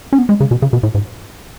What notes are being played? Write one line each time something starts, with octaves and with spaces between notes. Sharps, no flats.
C#4
B3
G#3
C#3
B2
C#3
B2
A2
G#2